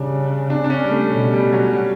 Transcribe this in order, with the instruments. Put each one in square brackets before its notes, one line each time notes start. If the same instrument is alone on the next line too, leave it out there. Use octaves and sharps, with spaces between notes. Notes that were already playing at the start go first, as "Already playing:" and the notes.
Already playing: [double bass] C#3 [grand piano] G3 D4
[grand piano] D4
D4
C#4
G3
A3
[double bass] B2 [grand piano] G3
[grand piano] G3
F#3
G3